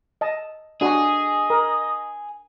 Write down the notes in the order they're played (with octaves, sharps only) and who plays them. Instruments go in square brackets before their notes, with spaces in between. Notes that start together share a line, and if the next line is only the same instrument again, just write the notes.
[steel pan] D#5 A5
[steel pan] D4 F#4 [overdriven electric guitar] G#4 [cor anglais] D#5
[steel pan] A#4